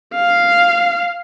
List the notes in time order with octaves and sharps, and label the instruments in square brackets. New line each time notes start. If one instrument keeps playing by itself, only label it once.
[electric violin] F5